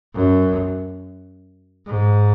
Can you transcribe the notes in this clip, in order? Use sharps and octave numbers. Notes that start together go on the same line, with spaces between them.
F#2
G#2